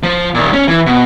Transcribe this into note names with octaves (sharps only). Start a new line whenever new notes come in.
F3
A#2 D#3
C#4
E3
B2